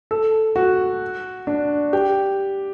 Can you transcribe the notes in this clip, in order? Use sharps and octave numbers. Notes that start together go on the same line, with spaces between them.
A4
F#4
D4
G4